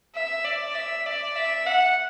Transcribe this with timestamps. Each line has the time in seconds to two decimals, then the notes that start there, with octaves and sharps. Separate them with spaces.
0.15 E5
0.45 D5
0.75 E5
1.06 D5
1.36 E5
1.66 F#5